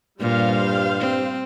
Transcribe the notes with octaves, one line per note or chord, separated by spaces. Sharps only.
G2 A#2 G3 C5 F5
C4